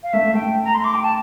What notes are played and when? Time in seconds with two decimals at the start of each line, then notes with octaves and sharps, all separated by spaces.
0.03 F5
0.13 A3 E5
0.34 A3 G5
0.64 A#5
0.74 C6
0.84 D6
0.94 G5
1.04 A5